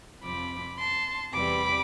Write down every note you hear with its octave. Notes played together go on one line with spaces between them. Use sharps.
F2 C3 F3 B5 D6
A5 C6
E2 C3 E3 G3 B5 D6